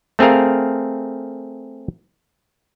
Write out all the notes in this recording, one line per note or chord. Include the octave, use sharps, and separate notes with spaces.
A3 C4 G#4 A#4 F5